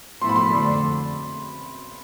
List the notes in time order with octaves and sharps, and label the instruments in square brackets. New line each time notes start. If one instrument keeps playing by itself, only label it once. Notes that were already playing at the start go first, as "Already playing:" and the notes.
[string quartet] A2 F3 B3 E4 A4 [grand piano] C6
[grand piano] B5
C6
[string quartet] F2 D3 A3 D4 A4